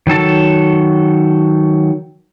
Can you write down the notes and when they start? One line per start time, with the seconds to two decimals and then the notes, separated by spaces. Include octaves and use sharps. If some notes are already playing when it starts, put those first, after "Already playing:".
0.07 D#3 F#3 A4 A5